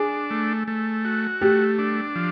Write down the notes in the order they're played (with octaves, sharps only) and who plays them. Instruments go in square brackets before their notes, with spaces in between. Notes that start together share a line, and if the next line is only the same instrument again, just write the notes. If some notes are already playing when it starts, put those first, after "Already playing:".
Already playing: [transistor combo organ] D4 [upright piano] G#4
[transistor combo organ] A3
A3
F#4
[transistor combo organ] A3 [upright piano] G4
[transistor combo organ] D4
F3